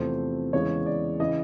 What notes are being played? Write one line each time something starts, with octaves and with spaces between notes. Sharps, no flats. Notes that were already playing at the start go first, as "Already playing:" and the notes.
Already playing: E2 C3 F3 A3 C5
E2 C#3 E3 G#3 C#5
D5
C#3 E3 D#5